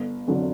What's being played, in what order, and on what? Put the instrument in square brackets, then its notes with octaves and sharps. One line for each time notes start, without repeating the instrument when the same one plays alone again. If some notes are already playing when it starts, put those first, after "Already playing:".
Already playing: [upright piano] G1
F2 D3 F#3